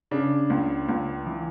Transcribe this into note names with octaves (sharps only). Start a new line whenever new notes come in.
C#3 D4
C#2
C#2
E3